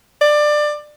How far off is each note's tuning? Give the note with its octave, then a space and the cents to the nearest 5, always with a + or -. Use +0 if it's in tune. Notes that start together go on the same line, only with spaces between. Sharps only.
D5 +20